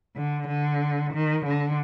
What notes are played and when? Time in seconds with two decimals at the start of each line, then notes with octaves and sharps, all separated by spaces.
0.16 D3
0.47 D3
1.13 D#3
1.45 D3